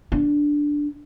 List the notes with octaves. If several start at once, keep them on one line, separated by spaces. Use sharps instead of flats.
D4